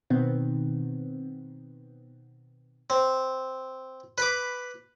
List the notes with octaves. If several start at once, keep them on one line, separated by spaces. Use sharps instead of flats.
B2 D#3 B3 C4
C4
B4 B5 D6